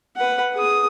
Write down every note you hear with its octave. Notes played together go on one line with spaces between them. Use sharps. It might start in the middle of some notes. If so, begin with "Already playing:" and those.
B4 F#5
G#4 D#6